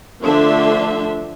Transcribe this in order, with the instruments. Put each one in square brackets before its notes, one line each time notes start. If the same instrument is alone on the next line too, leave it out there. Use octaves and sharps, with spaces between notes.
[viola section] D3 F3 A3 D4 E5 C6